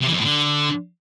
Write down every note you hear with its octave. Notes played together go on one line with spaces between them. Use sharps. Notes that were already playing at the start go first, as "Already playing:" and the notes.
C3
E3
F2
A2
D3